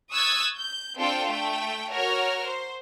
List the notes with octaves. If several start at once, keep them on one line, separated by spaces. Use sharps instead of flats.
C#6 D#6 E6 F#6 G#6 A6
G6
C4 D4 F4 A4 G5
A3 G5
F#4 A#4 C#5 F6
C5